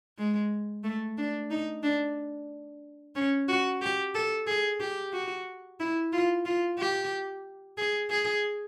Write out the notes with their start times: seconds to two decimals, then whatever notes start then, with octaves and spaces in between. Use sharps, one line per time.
0.18 G#3
0.84 A3
1.18 D4
1.51 D#4
1.83 D4
3.15 C#4
3.48 F#4
3.82 G4
4.15 A4
4.47 G#4
4.80 G4
5.13 F#4
5.80 E4
6.13 F4
6.45 F4
6.79 G4
7.78 G#4
8.11 G#4